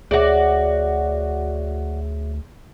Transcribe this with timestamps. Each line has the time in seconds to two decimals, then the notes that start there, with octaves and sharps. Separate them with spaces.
0.11 D2 F#4 G#4 C#5 D5 E5